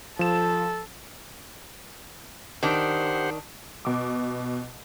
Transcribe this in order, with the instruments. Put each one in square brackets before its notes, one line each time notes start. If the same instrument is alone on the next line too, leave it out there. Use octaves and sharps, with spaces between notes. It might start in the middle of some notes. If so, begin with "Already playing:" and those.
[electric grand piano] F3 E7 [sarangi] A4
[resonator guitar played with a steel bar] D#3 D4 [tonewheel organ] G4 C5 F#5
[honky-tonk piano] B2 D6